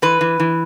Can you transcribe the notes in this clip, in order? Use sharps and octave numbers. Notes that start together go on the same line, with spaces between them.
E3 B4
E3
E3